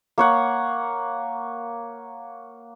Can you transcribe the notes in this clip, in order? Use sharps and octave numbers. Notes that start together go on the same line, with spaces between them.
A#3 C#5 F#5